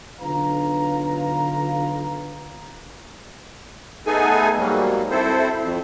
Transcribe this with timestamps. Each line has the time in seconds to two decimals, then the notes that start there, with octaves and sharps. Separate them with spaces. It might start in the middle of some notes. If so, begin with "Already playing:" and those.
0.20 B1 D3 F4 B4 F5 A#5
4.07 A3 B3 D#4 G#4 A4 G#5
4.58 G#2 F#3 G3 A#3
5.11 C4 E4 A4 C5
5.62 F2